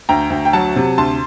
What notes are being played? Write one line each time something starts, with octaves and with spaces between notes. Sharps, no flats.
D2 G5 A#5
D2
G5
F#3 F#5 A5
C3
D2 A5 C6